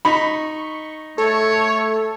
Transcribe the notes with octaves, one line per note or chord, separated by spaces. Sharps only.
D#4 B5 C#6
A3 A4 C#5